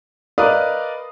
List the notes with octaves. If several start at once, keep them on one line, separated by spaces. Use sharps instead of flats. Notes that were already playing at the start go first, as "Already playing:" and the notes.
A#4 B4 D5 D#5 F5 D#6